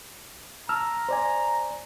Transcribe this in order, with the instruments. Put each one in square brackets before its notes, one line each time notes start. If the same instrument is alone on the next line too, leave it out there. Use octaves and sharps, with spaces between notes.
[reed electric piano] A5 E6 F6 [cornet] A#5
[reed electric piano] C5 D5 G#5